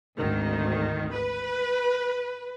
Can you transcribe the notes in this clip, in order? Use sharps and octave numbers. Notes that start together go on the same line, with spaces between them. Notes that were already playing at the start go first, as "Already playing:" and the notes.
G#1 D2 D#3
B4